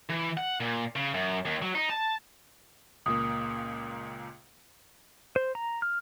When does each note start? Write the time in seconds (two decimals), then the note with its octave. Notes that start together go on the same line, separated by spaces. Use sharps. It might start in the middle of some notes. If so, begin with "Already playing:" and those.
0.10 E3
0.37 F#5
0.60 A#2
0.95 C#3
1.14 F#2
1.45 D#2
1.62 F#3
1.75 D#4
1.89 A5
3.06 C#2 A#2 A#3 D#6
5.36 C5
5.55 A#5
5.82 F6